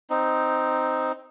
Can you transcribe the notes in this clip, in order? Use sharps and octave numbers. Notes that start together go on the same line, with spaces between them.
C4 D#4